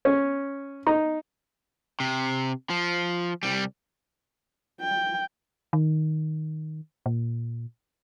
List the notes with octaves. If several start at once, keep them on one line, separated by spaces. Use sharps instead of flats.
C#4
D#4
C3
F3
C2 G3
G5
D#3
A#2